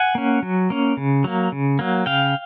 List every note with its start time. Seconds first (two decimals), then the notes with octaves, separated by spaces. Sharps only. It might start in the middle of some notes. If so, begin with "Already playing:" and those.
Already playing: F#5 G#5
0.15 A#3 C#4
0.43 F#3
0.70 A#3 C#4
0.97 C#3
1.24 F#3 A#3
1.52 C#3
1.79 F#3 A#3
2.06 C#3 F5 G5